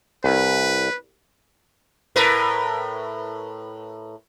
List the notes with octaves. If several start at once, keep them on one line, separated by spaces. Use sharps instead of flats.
C2 B4
A2 A#4 B4